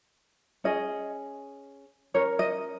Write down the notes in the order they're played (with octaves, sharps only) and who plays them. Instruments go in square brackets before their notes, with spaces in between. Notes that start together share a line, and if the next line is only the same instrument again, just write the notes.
[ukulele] C#4 G#4 D#5
C#4 A#4 C#5
D#5